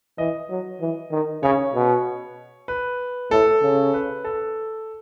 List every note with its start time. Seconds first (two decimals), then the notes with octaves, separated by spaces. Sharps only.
0.18 E3 D#5
0.49 F#3
0.81 E3
1.11 D#3
1.43 C#3 C#5
1.75 B2
2.68 B4
3.31 A2 A4
3.62 C#3
3.94 B4
4.25 A4